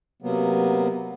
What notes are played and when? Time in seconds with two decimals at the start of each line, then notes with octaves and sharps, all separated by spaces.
0.22 C3 F#3 A#3 B3